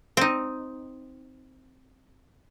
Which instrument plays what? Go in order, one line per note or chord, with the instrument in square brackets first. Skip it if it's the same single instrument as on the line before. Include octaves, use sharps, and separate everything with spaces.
[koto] C4 D#4